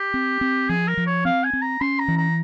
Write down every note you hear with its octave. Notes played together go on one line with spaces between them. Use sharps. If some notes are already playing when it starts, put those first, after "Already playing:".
Already playing: G4
C4
C4
F3 G#4
A#4
F3
C#5
C4 F5
G#5
C4
A#5
C#4 C6
A#5
E3
A#5